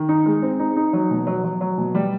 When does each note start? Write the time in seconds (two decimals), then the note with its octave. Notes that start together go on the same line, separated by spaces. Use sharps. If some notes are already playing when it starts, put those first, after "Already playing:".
Already playing: D#3
0.09 D#4
0.26 G#3
0.42 C4
0.59 D#4
0.76 D#4
0.93 F#3
1.11 B2
1.27 F#3
1.44 F#3
1.61 F#3
1.78 B2
1.95 G3